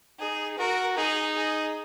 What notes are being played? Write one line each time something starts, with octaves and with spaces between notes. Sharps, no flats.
D#4 G#4
F#4 A#4
D#4 G#4
G#4